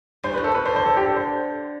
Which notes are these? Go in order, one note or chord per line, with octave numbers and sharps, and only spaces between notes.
G2 C5
B4
A2
A4
B2 B4
D3 C5
C5
A4
G4
A4
C5